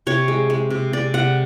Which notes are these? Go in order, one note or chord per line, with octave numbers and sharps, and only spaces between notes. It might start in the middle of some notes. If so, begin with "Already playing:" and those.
C3 C#5
G#3
G#3
C3
C3 D5
C3 F#5